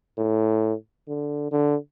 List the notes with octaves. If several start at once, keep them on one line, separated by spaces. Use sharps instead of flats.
A2
D3
D3